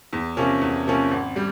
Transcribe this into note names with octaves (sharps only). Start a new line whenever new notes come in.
E2
C3 F3 A#3 C#4
E2
C3 F3 A#3 C#4
G#1
G3